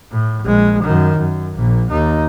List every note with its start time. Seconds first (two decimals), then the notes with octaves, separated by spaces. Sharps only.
0.12 A2
0.43 A#1 G#3
0.83 F#2 D#3
1.18 F#2
1.55 A#1 A#2
1.91 D#2 D#4